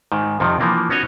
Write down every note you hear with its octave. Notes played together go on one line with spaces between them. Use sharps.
G#2 D#3
F2 C3 D#3 F3
E3 F3 A#3 D4
B3 C#4 D#4 F#4 C#5 D#5